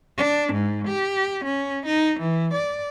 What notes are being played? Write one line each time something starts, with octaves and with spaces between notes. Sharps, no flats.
D4
G#2
G4
C#4
D#4
E3
D5